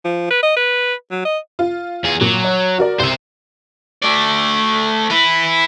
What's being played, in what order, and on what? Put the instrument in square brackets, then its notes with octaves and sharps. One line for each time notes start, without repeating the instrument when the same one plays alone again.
[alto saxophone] F3
B4
D#5
B4
F#3
D#5
[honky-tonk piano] F4
[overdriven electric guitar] E2 G#4
[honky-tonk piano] A#2 [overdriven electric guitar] F#3
[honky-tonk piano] C#5
F#4 A#4 D5
[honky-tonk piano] C2 [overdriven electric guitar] C5 E5
[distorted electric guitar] A3 D5
E4 B4